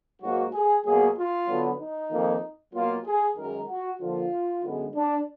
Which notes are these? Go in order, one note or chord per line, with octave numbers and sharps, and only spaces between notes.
G#2 F#3 A#3 F#4
G#4
B2 F#3 A#3 G#4
F4
D3 F#3 B3
D#4
F2 D#3 A#3
B2 F#3 A#3 F4
G#4
F#2 D#3 G#3 A#4
F#4
D3 F3 A#3 F4
F#2 D3 G#3 B3
D4